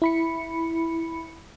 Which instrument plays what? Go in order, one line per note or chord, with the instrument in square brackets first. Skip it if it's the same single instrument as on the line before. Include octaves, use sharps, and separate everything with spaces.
[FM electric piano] E4 B5 C#7